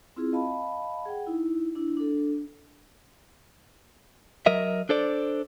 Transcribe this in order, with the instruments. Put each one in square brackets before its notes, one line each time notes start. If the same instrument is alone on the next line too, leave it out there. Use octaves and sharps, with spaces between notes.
[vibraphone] C4 E4 F4 G#4
D#5 F5 A5 B5
G#4 F#5 G5
D#4 E4
D4 E4
D4 A4
[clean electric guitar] F#3 A#4 D#5 E5
D4 A4 C5 D5